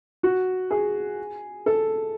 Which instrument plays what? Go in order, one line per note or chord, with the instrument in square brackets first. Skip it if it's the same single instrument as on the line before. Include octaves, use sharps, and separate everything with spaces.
[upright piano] F#4
G#4
A4